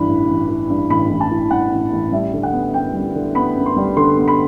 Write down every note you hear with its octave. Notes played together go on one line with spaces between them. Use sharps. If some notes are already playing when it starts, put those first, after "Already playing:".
Already playing: G2 E3 B5
A1
A1
E3
G2
A1 B5
A1
A5
E3
G2 F#5
A1
A1
G3 E5
D3
F#5
B3
F#2 G5
G3
D3
B3 B5
F#2
C6
G3
D3 C6
B3
B5